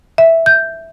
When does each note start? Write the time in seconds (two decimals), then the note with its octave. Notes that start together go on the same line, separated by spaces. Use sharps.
0.18 E5
0.46 G6